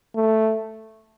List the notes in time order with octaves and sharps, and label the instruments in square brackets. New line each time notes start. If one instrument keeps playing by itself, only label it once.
[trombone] A3